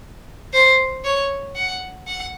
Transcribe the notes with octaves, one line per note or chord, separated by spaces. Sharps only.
C5
C#5
F#5
F#5